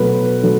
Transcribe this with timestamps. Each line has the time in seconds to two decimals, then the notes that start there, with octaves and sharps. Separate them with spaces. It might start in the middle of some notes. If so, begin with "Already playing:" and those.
Already playing: B2 F#3 A3 B4
0.43 F#3 A3